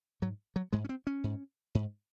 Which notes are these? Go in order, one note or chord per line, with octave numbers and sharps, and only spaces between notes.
G#2 F#3
F#3
G#2 G#3
C#4
C4
C#4
G#2
G#2